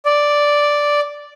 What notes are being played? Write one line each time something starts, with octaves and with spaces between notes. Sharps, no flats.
D5